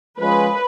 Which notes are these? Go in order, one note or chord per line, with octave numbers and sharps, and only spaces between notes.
F3 G#3 C#4 F4 G#4 B4